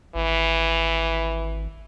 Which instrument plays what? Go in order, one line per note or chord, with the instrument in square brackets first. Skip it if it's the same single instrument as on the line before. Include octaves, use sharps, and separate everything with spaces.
[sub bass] G#1 [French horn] E3